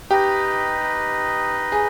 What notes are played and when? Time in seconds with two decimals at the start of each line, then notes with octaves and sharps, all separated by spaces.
0.10 D#4 G4 B4 D#5
1.72 G#4